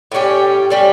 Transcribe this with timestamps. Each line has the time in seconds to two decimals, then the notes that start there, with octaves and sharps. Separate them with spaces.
0.12 A2 G3 C#4 G4
0.70 A2 G3 C#4 G4